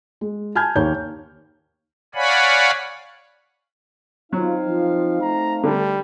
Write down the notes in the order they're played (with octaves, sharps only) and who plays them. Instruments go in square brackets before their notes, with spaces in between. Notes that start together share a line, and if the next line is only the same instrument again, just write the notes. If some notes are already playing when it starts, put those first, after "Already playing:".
[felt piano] G#3
G#5 A5 F6 G6 G#6
D#2 A#3 C#5 G6
[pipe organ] C#5 D5 F5 F#5 G#5 B5
[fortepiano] F#3 [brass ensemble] C4 D#4 F5 [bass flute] F4
[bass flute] F3
[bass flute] A3 [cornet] A#5
[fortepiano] D3 [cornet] G3